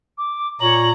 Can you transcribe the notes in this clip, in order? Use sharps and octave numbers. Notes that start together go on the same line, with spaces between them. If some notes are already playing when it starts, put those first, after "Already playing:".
D6
A#2 C#5 A#5 F#7